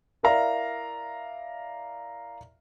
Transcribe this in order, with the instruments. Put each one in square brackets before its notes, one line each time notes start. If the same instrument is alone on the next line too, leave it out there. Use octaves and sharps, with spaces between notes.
[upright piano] E4 A#4 D5 E5 F5 A#5